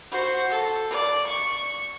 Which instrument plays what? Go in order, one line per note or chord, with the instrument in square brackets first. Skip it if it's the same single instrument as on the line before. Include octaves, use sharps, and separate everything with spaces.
[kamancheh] F#4 C5
A4
D5
C#6